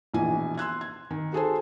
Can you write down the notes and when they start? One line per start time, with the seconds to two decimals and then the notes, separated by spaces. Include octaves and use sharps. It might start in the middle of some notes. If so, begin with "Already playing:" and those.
0.14 A#1 B2 E3 G#5
0.58 C6 E6 F#6 G#6
0.81 G#6
1.11 D#3
1.33 F#4 G#4 A4 C5